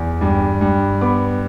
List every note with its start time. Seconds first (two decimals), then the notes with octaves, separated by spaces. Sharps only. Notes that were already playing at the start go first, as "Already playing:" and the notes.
Already playing: E2
0.21 G2
0.61 G2
1.01 B3 B5 D6